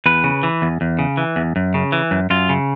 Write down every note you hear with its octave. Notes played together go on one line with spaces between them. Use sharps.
E2 B4
C#3
E3
E2
E2
C#3
E3
E2
F#2
C#3
E3
F#2
F#2 F4
C#3